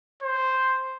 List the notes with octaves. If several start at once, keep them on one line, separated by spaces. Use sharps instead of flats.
C5